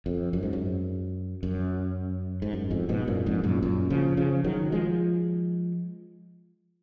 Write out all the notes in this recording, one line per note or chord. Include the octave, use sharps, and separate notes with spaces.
F2
F#2
G#2
F#2
F#2
G#2
F#2
F2 G#2
G#2 B2
F#2 A#2
F2 G#2
F#2 A#2
F#2 A#2
C#3 F3
C#3 F3
D#3 F#3
F3 G#3